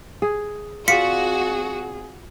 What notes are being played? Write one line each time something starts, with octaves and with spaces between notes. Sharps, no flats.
G#4
C4 F4 F#4 G#4 D5 B6 C#7